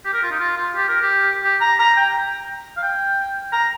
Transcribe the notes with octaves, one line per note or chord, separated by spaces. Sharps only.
G4
A#4
F4
D#4
F4
F4
G4
A#4
G4
G4
A#5
A#5
G5
F5
G5
A#5